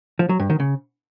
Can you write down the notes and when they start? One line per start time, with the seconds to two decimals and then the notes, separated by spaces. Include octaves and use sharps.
0.19 F3
0.29 F#3
0.39 G2
0.50 D#3
0.60 C#3